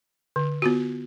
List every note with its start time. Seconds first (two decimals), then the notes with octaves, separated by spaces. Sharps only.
0.36 D3
0.62 B3 F4 F#4